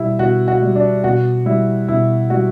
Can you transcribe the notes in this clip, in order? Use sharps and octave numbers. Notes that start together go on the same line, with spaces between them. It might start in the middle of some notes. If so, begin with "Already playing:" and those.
Already playing: B2 G3 E4
B2 F#4
F#4
G3
D4
B2 F#4
G3 E4
B2 E4
G3 F#4